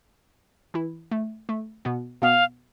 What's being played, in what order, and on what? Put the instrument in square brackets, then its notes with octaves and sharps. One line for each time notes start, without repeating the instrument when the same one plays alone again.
[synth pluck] E3 E4
A3
A3
B2 B3
[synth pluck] B2 B3 [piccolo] F5